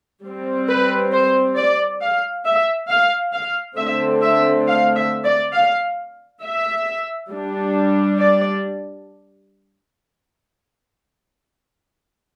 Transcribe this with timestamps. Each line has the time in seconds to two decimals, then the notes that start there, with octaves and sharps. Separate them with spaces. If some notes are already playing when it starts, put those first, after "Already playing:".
0.24 G3 C4
0.69 B4
1.13 C5
1.56 D5
2.01 F5
2.45 E5
2.89 F5
3.34 F5
3.77 D3 A3 C4 E5
4.22 E5
4.66 F5
4.95 E5
5.25 D5
5.54 F5
6.43 E5
7.30 G3 D4
8.19 D5